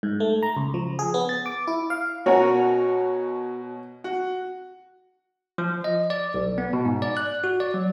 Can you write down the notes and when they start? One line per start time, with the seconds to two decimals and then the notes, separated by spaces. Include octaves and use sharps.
0.03 G#2
0.20 A3
0.43 A#5
0.57 C#2
0.74 F3
0.99 G#4
1.14 B3
1.29 A6
1.46 D6
1.67 E4
1.90 F5
2.26 B2 C#4 F#4 A#4 C#5 F#5 G#5
4.04 F#4 F#5
5.58 F3
5.84 D#5
6.10 D5
6.34 B1
6.58 B3
6.73 B2
6.85 G#2
7.02 D5
7.17 F#6
7.44 F#4
7.60 D5
7.74 F#3